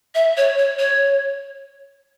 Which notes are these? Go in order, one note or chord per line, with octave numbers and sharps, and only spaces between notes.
E5
C#5
C#5
C#5